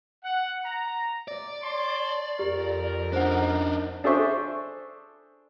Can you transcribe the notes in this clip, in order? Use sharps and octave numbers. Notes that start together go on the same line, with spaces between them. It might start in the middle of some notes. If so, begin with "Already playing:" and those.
F#5
A#5
D5
C#5 A5 C6
F2 G4 A#4
D4 D#4 C5 F#5
D4 G#4 A4 C5 E5 C#6